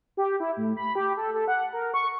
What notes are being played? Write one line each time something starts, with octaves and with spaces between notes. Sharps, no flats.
G4
E4
A2
B5
G4
A4
A4
F#5
A#4
C#6